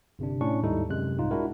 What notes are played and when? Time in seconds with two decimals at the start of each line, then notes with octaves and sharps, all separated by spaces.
0.19 G1 C3 D4
0.41 A2 C#4 D4 C#6
0.63 D#2 G#2 G3 D#4 E4 A4
0.89 F#2 C3 G#3 F#6
1.18 C2 G#2 D#4 F4
1.31 G#3 D4 E4 F#4 A#4